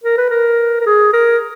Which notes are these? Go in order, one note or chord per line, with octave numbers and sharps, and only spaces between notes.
A#4
B4
A#4
A#4
G#4
A#4